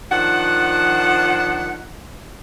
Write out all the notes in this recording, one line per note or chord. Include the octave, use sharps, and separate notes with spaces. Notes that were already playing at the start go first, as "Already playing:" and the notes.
D#3 F3 D4 F#5